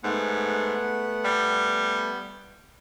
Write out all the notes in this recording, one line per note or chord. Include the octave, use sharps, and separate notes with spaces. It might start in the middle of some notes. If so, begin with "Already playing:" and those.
G#2 A3 B3 F#5
G3